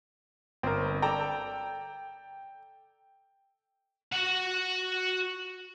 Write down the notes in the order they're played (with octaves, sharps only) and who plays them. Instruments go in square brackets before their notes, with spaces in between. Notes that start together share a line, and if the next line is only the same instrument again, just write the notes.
[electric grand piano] G1 A#4 [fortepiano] C4
[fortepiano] A4 D5 A#5 [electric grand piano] G5
[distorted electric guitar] F#4 F#5